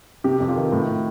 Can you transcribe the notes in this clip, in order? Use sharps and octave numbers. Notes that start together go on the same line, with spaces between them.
C3 G4
F2
F4
D#3
A2